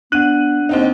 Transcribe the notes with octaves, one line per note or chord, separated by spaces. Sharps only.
B3 D4 F#5 F#6 D#7 F#7
D#2 C4 D#4